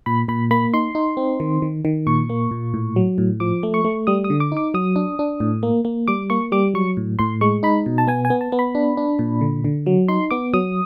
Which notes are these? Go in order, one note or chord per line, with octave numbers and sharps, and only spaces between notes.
A#2 B5
A#2 B5
A#3 B5
D#4 C6
D#4
C4
D#3
D#3
D#3
A#2 C#6
A#3
A#2
A2
F#3
A2
F3 D6
A3
C#6
A3
G3 D#6
D#6
D3
D6
D#4 D6
F#3 D#6
D4
D4
A2
A#3
A#3
G3 D6
A#3 C#6
G3 D6
F#3 C#6
A2
A2 C6
G#3 C#6
D#4 B5
B2
A5
B3 G#5
G#5
B3
A5
B3
B5
D4
D4
A#2
D3
D3
F#3
D#4 C6
B3 D6
F#3 D#6